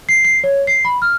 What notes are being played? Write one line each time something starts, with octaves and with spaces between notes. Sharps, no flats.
C7
C7
C#5
C7
B5
F6